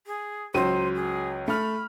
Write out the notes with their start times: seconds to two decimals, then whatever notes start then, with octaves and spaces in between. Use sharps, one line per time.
0.06 G#4
0.54 C#2 F#3 C5 D#7
0.95 G#4
1.48 A3 B5 F6